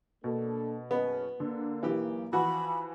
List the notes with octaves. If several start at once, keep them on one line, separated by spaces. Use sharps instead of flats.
B2 A#3 D4 A4
F#1 B3 C#4 D#5
D3 A#3
B1 E3 G4
E3 F3 F#4 B5